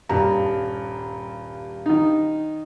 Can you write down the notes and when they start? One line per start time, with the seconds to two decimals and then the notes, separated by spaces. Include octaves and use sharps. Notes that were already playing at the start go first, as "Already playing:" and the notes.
0.09 D#1 G2 A#5
1.86 D#3 D#4